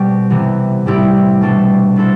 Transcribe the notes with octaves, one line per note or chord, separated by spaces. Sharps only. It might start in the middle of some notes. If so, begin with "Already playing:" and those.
Already playing: B2 G3 C4 G4
C3 E3 B3
A2 G3 C4 E4 G4
B2 G3 D4 A4
B3 E4 A4 C5